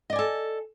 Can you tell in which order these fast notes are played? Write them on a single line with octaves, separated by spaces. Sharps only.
D#5 D5 G#5 A4